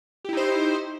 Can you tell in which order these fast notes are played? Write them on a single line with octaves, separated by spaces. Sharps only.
G4 E4 D#4 C5